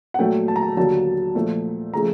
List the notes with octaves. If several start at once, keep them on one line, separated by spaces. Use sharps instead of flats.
F#5
A#2 F#3 A3 G5
A5
A#5
A5
D#2 D3 F#3 A5
A#2 F3 A3
C#3 F3 A3 A#5